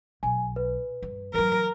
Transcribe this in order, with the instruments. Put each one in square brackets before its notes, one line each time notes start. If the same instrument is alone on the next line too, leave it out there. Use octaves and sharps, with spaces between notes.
[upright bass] B1 [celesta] G#5
[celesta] B4
[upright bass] G2
[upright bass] E3 F#3 [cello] A#4